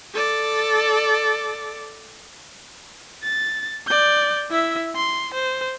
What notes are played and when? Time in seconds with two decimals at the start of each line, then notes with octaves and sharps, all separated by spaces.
0.13 A4 D5
3.24 A6
3.87 D5 G6
4.51 E4 E5
4.96 C6
5.34 C5